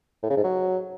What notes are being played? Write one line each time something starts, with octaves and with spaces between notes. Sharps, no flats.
A2
C#3
G#2
F#3